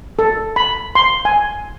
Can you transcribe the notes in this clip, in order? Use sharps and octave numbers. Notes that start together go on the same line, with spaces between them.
A4
B5
C6
G#5